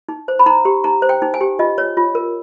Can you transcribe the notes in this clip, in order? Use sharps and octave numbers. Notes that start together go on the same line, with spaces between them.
D#4
C5
B5
D#4 A#5
G4
D#4 A#5
C5
G5
D#4
G#5
G4
F4 D#5
C#5
F4
A#4